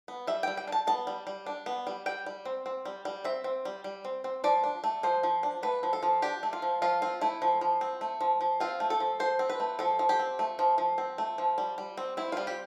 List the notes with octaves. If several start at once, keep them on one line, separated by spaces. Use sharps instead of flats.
B3
G3 E5
G3 G5
G5
D4
A5
B3 A5
G3
G3
D4
B3
G3
G3 G5
G3
C4
C4
G3
G3
C4 E5
C4
G3
G3
C4
C4
F3 D5
D4
A3
F3 C5
F3
D4
A3 B4
F3
A4
F3
D4 G4
A3
F4
F3
F3 F4
C4 F4
A3 E4
F3
F3
C4
A3
F3
F3
C4 F4
A3
A4
F3
F3 C5
C4
B4
A3
F3 A4
F3
G4
C4
A3
F3
F3
C4
A3
F3
G3
G3
C4
C4 E4
G3 F4
G4